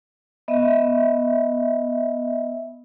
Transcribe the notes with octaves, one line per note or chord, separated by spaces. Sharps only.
B3 D#5 E5